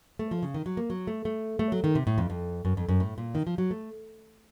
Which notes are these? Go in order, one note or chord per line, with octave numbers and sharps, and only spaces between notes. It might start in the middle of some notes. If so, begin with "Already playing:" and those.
A3
F3
C#3
D#3
F#3
A#3
F#3
A3
A3
A3
F#3
D#3
C3
A2
F2
F2
F#2
F2
F#2
A2
A#2
D#3
F3
F#3
A3